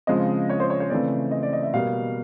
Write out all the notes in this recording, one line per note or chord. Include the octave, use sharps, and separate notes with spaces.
C#3 F3 G#3 C4 D#5
C#5
C5
C#5
C#5
C#3 E3 A3 C4 D5
D#5
D5
D#5
E5
B2 G3 A#3 F5